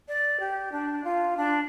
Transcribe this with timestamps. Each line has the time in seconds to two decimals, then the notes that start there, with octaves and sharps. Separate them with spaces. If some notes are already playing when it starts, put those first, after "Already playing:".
0.08 D5
0.40 G4
0.72 D4
1.04 F4
1.37 D4